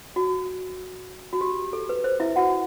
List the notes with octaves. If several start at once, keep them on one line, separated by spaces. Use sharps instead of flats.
F#4
F#4
G4
A4
B4
C5
E4 E5
F#4 F#5